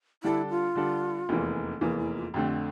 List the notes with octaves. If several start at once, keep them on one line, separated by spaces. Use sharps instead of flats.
D3 G3 D4 E4 A4
F4
D3 G3 D4 A4
F1 E2 E3 A#3
F1 E2 E3 A#3 E4
E4
F4
F2 D3 A3 C4 G4